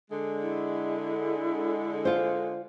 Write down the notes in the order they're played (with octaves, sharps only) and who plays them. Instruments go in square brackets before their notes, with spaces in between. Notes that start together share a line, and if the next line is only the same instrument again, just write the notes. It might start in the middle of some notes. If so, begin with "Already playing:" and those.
[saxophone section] D3 G#3
[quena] E4
[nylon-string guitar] F4 C5